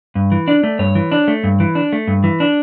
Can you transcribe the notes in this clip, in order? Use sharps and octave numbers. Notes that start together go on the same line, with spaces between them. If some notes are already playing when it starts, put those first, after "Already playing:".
G2
E3
D4 D5
A3
G2 C#5
E3
D4
A3
G2
E3
D4
A3
G2
E3
D4